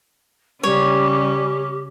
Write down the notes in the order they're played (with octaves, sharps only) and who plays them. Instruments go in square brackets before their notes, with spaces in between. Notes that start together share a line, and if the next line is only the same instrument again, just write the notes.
[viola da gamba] C#3 C#4 [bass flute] G3 [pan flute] G4 [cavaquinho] C#5